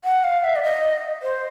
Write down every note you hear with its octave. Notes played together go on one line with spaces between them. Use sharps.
F#5
F5
E5
D5
D#5
C5